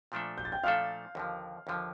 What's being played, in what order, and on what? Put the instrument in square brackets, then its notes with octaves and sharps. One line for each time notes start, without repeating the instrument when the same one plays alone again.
[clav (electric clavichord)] A#2 F3 A3 D4 A4
[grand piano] G6
A6
G5 G6
[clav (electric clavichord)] A#2 F3 A3 D4 A4 [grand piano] F5 F6
[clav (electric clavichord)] D#2 D3 F3
D#2 D3 F3